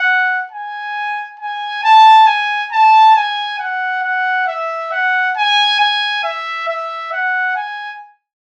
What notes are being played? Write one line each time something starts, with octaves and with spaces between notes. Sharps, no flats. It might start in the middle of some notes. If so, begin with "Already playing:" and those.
Already playing: F#5
G#5
G#5
A5
G#5
A5
G#5
F#5
F#5
E5
F#5
G#5
G#5
E5
E5
F#5
G#5